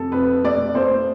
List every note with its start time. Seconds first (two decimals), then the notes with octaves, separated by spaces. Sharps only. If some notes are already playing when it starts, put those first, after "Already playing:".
Already playing: F2 A3 A4
0.12 F2 B4
0.44 A3 D5
0.75 A3 C5